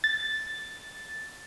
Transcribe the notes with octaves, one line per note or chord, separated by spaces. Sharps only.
A6